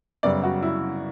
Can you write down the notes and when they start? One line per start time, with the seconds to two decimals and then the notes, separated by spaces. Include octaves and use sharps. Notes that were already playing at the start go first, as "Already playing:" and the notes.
0.23 F#2 C#3 G3 B3 D5
0.44 F#4
0.63 E4